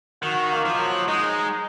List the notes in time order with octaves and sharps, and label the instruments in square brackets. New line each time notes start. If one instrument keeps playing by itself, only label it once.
[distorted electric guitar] D#3 [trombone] F#4
[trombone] A#3
[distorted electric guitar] F3
[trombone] F#3
[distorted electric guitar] G#3 [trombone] D#4